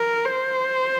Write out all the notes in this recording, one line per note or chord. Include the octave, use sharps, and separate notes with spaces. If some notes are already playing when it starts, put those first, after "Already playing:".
Already playing: A#4
C5